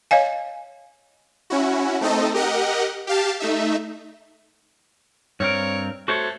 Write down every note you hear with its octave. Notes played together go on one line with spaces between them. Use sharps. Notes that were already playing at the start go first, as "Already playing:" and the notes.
C#5 D#5 F5 G#5
C#4 E4 F#4
A3 C4 D#4 A4 D#5
G4 A#4 D#5 F#5
G4 F5 A5
A3 D#4 E5
G2 C4 A#4 C#5
A3 F#4 C5 C#5